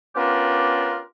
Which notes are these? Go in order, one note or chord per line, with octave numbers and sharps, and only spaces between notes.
B3 C#4 D4 F4 G4 A#4